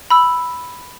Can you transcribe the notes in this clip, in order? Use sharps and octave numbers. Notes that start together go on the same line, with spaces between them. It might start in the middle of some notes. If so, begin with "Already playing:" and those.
B5 E6